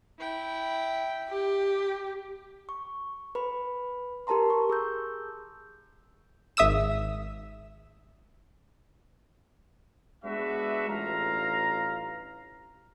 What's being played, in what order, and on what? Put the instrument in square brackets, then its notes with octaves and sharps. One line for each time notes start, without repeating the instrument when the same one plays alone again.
[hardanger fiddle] E4 G5
[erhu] G4
[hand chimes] C#6
B4 B5
G4 A#4 A5 A#5 C6
C#6
G#4 E6 G6
[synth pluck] G#1 E5 D#6 E6 E7
[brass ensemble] G#3 B3 D4 F#4 B4 E5
A1 G2 F4 F5 A#5